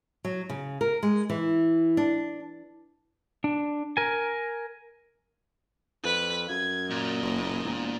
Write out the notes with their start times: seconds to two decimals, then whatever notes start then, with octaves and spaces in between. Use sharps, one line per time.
0.25 F#3
0.49 C#3
0.81 A#4
1.03 G#3
1.30 E3
1.97 D4
3.44 D4
3.97 A#4 G#5
6.04 F2 B4 B6
6.50 F#2 G#6
6.90 A#2 D#5
7.22 F#1
7.64 E1